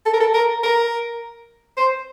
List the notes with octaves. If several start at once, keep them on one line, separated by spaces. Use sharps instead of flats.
A4
A#4
A4
A#4
A#4
C5